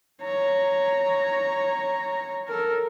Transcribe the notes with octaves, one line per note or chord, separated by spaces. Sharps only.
C#5 A#5
A4 A#4